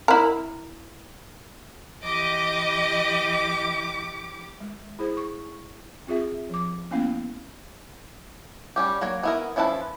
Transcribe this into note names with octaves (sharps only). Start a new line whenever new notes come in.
E4 A#4
E3 G4 D#5 D6
G#3
E4 G#4 C5
C#6
C4 F4 G#4 E5
F3 D6
A#3 B3 C#4 E4 F5
G3 C#4 G4
F#3 A#3 C#5
B3 E4 A#4
F3 C#4 E4 B4 A5